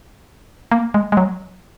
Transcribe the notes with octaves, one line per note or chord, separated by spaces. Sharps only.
A#3
G#3
G#3
F#3